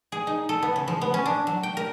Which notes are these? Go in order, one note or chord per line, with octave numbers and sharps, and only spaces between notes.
G#4
D#4
A4
B3
C#3
F3
B3
C#4
D4
F#3
G5
A#4